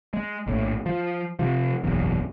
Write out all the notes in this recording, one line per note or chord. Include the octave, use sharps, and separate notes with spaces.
G#3
A#1 A2
F3
C3 F3
F#1 B1 E2